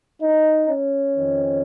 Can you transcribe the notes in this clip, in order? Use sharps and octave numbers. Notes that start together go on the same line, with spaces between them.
D#4
C#4
F2 D#3